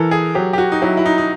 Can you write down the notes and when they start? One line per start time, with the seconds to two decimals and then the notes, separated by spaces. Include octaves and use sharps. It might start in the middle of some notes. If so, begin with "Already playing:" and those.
Already playing: E3 A4 A#4
0.11 G#4
0.35 F#3 G4
0.53 G4
0.58 F#4
0.72 D#4
0.82 F#3 E4
0.97 E4
1.06 D#4
1.18 D#4